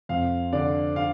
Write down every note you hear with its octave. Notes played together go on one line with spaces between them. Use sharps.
F2 F5
D3 D5
D3 F5